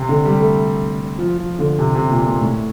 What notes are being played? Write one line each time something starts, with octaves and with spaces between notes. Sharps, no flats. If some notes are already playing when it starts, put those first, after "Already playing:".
Already playing: C3
D3
G3
A3
F3
F3
D3
C3
C3
A#2
A#2
A2